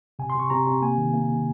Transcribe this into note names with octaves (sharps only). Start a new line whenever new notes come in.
C3 G#5
C6
C3 C#6
C3 A#5
C3
A#3 G#5
D#3
A#3
D#3